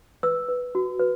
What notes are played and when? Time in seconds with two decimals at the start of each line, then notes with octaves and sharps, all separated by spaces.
0.23 B4 E6
0.49 B4
0.75 F#4
1.00 B4